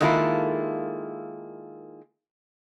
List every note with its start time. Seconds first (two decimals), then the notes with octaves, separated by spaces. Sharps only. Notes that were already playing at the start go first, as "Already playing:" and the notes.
0.01 D#3 G#3 A#3 E4 F4 A4